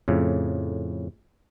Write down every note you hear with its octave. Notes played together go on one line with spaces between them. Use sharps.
F2 A2 C#3